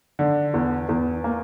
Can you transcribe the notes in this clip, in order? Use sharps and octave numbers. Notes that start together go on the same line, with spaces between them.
D3
E2
E2
A#3